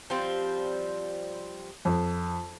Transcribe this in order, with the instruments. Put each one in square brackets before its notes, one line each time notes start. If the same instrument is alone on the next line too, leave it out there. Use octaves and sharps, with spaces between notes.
[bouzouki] F3 G3 C4
[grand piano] F2